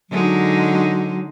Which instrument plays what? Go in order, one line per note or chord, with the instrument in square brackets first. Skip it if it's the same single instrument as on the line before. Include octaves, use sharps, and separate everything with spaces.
[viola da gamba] D3 G#3 D#4 [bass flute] F#3